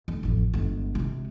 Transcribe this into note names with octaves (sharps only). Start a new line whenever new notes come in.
F1
A1 F2
G1 G#3
C3 G#3